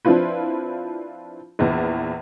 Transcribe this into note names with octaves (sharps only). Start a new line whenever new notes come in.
F3 C4 D4 E4 F4 B4
A#1 E2